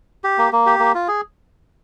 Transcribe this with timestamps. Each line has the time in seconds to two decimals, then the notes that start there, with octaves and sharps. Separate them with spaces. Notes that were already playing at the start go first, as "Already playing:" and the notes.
0.24 G4
0.38 A#3
0.53 A#3
0.66 G4
0.79 A#3
0.95 F4
1.08 G#4